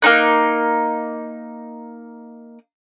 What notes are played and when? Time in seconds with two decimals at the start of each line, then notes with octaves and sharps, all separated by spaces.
0.02 A#3 C4 D#4 F#6